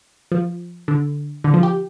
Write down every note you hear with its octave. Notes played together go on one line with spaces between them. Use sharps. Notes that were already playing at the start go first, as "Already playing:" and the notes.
F3
D3
D3
F3
G4